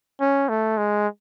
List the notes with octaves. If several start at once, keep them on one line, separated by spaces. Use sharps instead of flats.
C#4
A3
G#3